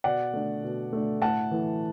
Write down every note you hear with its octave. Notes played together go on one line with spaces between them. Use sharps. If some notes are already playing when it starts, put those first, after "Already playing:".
B2 D5 F#5
A3 D4
B2
A3 D4
A2 F#5 A5
E3 A3